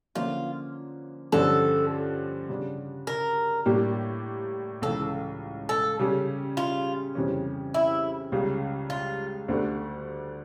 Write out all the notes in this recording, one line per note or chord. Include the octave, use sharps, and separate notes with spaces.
D3 F3 A#3 C#4 F4
G2 D3 F3 C#4 A4
C#3 G3 D4
A#4
A2 G3 A#3 D4 G4
C#2 C#3 E3 A4
A4
C#3 G3 C#4 G4
F4
F2 C#3 E3 G3 C#4
E4
C#2 C#3 G3
F4
D2 D3 A3 D4 G4